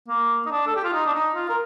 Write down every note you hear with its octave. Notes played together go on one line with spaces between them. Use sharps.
A#3
D#4
D4
A4
G4
F4
D#4
D4
D#4
F4
A#4